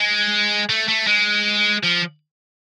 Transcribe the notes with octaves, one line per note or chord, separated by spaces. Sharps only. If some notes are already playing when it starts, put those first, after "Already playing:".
Already playing: G#3
A3
A3
G#3
F3